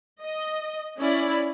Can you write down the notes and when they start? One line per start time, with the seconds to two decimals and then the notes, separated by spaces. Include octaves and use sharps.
0.22 D#5
0.98 C#4 E4 D5